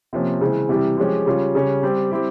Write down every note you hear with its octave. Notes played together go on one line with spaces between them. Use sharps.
C3 F3 A#3 C#4
C#3 E3 G#3 C4
C3 E3 G3
F3 G#3 C#4 G4
C#3 G3 C#4 F4
C#3 G3 C#4
G3 C4 G4
G3 C4 E4 G4